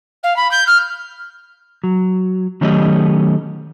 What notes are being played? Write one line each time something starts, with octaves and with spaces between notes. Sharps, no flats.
F5
B5
G6
F6
F#3
D#3 F#3 A3 C#4 G4 D#5